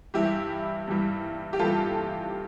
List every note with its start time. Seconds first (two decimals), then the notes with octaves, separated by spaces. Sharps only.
0.14 G2 E3 G3 E4 G4
0.87 G2 E3 G3
1.53 G4
1.59 G2 E3 G3 F4 A4